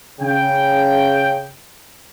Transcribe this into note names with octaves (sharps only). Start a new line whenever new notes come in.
C#3 G5